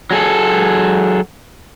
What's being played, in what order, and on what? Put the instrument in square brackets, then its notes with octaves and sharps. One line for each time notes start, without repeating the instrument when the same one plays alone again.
[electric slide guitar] F#3 G#4 A4